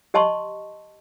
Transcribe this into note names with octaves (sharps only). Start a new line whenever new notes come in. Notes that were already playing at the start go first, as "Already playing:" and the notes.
G4 D#5 A5 C6 C#6